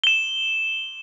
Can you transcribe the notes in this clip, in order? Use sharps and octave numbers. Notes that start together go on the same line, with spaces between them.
E7 G7